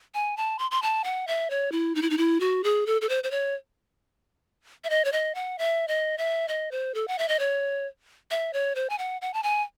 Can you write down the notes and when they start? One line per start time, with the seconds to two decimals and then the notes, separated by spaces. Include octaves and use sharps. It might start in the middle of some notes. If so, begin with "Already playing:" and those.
0.14 G#5
0.37 A5
0.59 C6
0.71 C6
0.82 A5
1.04 F#5
1.27 E5
1.50 C#5
1.72 E4
1.95 D#4
2.02 E4
2.10 D#4
2.18 E4
2.40 F#4
2.64 G#4
2.86 A4
3.01 A4
3.09 C5
3.24 C5
3.31 C#5
4.84 E5
4.90 D#5
5.05 C#5
5.12 D#5
5.35 F#5
5.58 E5
5.88 D#5
6.18 E5
6.48 D#5
6.71 C5
6.94 A4
7.08 F#5
7.19 E5
7.28 D#5
7.39 C#5
8.31 E5
8.53 C#5
8.75 C5
8.90 G#5
8.98 F#5
9.22 F#5
9.34 A5
9.43 G#5